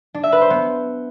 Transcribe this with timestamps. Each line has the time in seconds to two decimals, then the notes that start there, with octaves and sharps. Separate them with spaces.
0.14 D4
0.23 E5
0.32 B4
0.41 C5
0.50 B3